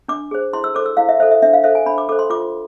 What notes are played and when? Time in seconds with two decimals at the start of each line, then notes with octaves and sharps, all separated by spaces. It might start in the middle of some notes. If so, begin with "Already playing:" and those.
0.08 D4 D6
0.31 G#4 C5
0.53 E4 C6
0.64 E6
0.75 A4 C5 D6
0.86 E6
0.97 E4 F5
1.09 E5
1.20 A4 C5 E5
1.31 E5
1.42 D4 E5
1.53 F5
1.63 A4 C5 E5
1.75 G#5
1.86 D4 B5
1.98 D6
2.09 A4 C5 D6
2.19 C6
2.30 F4 D6